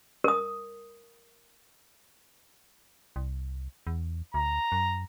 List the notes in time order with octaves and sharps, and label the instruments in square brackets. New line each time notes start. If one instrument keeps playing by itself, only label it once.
[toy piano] A#4 D#6
[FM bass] C2
E2
[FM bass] D2 [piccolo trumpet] A#5
[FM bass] F#2